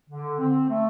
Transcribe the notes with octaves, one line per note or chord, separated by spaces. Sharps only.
D3
C4
A3